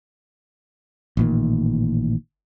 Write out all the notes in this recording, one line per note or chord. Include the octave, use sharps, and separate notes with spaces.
A1 A#2 D#3